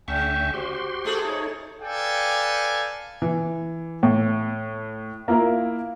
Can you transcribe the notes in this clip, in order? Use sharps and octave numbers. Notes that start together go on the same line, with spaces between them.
D2 C#3 E5 G5 G#5 C#6 G6
F#4 G4 C5 C6
A3 G#4 A4
D#4 C#5
A4 B4 D5 F5 G5 G#5
E3
A2
A#3 E4 F4 A#4